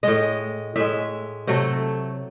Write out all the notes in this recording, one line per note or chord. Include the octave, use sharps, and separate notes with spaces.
A2 G#3 D#5
A2 G#3 E5
C3 F#3 A3 A4